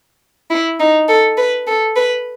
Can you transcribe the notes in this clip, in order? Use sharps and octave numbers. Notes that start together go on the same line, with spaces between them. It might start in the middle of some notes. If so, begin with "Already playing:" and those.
E4
D#4
A4
B4
A4
B4